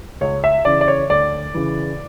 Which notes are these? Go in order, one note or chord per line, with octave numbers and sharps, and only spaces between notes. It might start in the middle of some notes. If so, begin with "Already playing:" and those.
C#2 C#5
E5
C#3 E3 D5
D5
C#5
D2 D5
C#3 E3